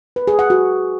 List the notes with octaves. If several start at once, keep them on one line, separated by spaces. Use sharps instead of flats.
B4
G#4
F#5
F#4